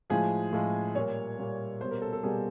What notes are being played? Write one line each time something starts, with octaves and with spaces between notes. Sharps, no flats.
A2 F3 G#3 G#4
A2 F3 G#3
A#2 G3 A#3 C#5
A#2 G3 A#3
B2 G3 A#3 C5
A#4
A4
A4
B2 G3 A#3 G#4